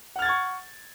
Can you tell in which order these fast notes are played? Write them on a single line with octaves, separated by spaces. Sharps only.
F#5 F6 A6 G#6 C#6